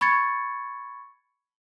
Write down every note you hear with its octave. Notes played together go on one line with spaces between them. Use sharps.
B5 C#6 G#6 A6 C#7